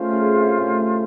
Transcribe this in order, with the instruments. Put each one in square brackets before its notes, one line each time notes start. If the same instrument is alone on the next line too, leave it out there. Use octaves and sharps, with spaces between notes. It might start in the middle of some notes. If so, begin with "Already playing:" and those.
Already playing: [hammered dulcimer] A3 [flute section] C#4 F4 C5 F5
[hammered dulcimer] C#3
C3
A2